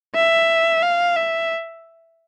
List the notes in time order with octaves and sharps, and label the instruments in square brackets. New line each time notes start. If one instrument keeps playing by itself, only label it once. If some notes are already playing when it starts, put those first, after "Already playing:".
[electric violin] E5
F5
E5